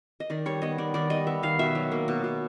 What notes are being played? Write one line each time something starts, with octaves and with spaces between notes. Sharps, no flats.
D#5
D#3 D5
G3 C#5
B3 D#5
D#3 D5
D#3 D5
G3 D#5
B3 E5
D#3 F5
B2 E5
F#3
A#3
B2
B2